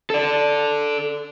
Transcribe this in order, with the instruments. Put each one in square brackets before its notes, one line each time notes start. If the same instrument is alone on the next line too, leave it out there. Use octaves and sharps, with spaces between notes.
[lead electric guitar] A4 D5